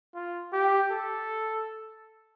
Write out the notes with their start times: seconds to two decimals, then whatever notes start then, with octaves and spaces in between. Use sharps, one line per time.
0.15 F4
0.53 G4
0.91 A4